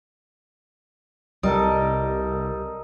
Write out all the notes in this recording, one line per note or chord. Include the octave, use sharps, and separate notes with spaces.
C2 G3 A4 A#4 D#5